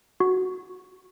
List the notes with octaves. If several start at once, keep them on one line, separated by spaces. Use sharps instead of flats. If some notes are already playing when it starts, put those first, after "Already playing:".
F#4